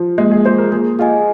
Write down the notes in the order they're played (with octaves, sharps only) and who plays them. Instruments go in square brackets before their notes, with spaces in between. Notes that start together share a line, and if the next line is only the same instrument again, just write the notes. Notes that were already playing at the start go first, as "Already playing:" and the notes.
Already playing: [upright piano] F3
[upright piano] G#3 [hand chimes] A#3
[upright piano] G#4
[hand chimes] F4 G#4 [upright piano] C5
[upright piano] A#4
[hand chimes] A#3 [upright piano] G#4
[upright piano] F4 [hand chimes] G#4 D#5 G#5